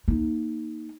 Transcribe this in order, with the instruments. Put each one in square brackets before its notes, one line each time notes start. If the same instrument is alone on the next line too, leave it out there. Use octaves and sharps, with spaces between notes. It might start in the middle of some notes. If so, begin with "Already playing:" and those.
[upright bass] A#3 D#4